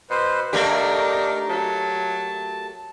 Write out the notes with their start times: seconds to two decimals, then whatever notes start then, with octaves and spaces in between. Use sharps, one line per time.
0.10 B2 B4 C5
0.53 A3 A#3 D4 D#4 G4 A#4
1.49 F#3 A5